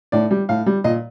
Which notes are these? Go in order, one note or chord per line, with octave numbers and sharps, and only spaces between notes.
A2 D5
G3
A2 F5
G3
A#2 D#5